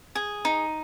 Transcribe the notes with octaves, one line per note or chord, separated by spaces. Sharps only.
G#4
D#4